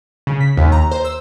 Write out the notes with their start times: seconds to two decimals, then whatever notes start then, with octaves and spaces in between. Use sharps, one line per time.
0.27 C#3
0.41 B6
0.57 D#2
0.72 A#5
0.91 C5
1.05 E6